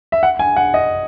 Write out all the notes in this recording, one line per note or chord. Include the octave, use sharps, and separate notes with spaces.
E5
F#5
G#5
F#5
D#5